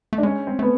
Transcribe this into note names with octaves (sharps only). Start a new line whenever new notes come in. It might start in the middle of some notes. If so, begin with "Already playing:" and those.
A3
D4
G#3 C#4
C4
A3 B3